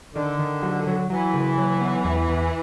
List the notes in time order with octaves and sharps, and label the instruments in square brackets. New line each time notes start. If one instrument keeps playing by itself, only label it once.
[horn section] D3 [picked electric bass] D#3
[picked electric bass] D#3
F#3
F#3
[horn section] E3 [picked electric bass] F#3
[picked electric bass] C#3
F#3
B3
E2
E2